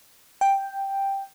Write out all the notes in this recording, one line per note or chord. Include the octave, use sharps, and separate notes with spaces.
G5